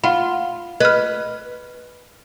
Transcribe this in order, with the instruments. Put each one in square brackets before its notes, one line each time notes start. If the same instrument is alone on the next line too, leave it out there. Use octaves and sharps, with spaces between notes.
[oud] F4 [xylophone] F#5 B5
[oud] B4 [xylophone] D#5 F6